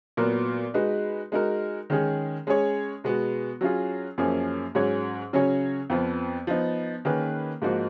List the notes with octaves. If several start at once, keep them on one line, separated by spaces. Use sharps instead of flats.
A#2 F#3 B3 F#4 A#4
G#3 D#4 F#4 B4
G#3 D#4 F#4 A#4
D#3 G#3 C#4 G#4
G#3 C#4 G#4 C#5
B2 G#3 B3 F#4
F#3 C#4 F4 G#4
F#2 F3 A#3 C#4 G#4
G#2 F#3 C#4 G#4 C#5
C#3 F#3 C#4 G#4 C#5
F2 F3 B3
F3 B3 D#4
D#3 A#3 C#4 G#4 B4
G#2 F3 A#3 D#4 F#4